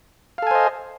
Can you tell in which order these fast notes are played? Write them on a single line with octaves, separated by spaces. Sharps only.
F5 A4 G#5 C5 D#5